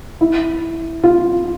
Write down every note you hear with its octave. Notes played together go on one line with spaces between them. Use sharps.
E4
F4